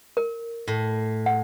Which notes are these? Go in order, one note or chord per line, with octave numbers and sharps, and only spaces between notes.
A#4
A2
F#5